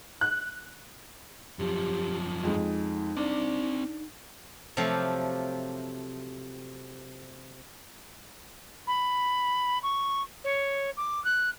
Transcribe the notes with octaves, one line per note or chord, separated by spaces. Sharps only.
F#6
F#2 F3 G4
F2 G#3 D#4
C4 D4 D5
C3 F3 F#3 A3 G4 F5
B5
C#6
C#5
D6
F#6